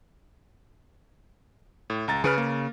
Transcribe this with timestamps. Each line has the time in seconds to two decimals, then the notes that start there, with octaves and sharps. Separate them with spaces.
1.90 A2
2.08 C#2 A#5 A6
2.24 C#3 G#4 B4 F6
2.38 A#3